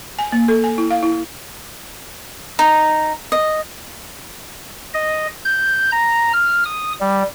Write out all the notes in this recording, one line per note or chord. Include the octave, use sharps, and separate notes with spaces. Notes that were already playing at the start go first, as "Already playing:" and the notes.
G#5
A#3
A4
G#5
E4
F5
E4
D#4
D#5
D#5
G6
A#5
F6
D#6
G3